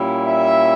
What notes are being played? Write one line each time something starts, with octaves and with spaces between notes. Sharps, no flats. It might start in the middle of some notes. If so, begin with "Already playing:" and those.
Already playing: A#2 G3 C#4 E4
E5